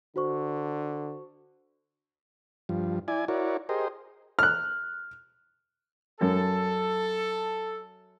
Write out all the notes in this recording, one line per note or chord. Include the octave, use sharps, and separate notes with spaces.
D3 F#4 C5 C#6
G2 F3
E4 D5 G#5
E4 F#4 A#4 C#5 D5
G4 G#4 A#4 C5 D#5
F6 F#6
F#2 A4